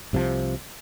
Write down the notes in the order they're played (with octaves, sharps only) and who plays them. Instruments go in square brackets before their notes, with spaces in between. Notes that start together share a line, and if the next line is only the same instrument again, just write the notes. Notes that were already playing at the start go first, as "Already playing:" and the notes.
[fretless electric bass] C2 C3 D#3 F3